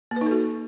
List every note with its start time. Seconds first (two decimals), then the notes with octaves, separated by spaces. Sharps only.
0.11 A#3
0.16 B4
0.21 D#4
0.26 A4
0.31 F#4